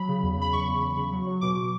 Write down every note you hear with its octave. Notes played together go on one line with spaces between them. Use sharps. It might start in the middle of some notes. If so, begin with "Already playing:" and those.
Already playing: F#3 B5
C#3
E2
C#3 B5
E2 C#6
E2
E2
C#3
F#3
F#3
B2 D6
B2